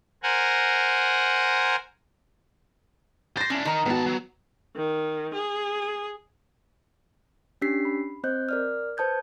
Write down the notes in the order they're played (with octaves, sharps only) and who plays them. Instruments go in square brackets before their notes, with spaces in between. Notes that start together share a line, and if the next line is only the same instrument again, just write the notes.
[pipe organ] A#4 C5 F#5 G#5 A#5
[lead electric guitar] C5 [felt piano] A6 A#6
[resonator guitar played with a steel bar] C#4 [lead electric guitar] D4 E4
[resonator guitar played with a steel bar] D#3 A#5 [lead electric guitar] D#4 A#4
[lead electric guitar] G#2 A5 [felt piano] B3 F#4
[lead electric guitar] F#3
[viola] D#3
G#4
[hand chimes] C#4 D4 G4 E6 B6 C7
B5
C4 C5 D#5 F#6 G6
A#4 D5 F6
B4 C5 A5 D#6 G6 G#6